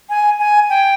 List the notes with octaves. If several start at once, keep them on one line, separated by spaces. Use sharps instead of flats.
G#5
G#5
G5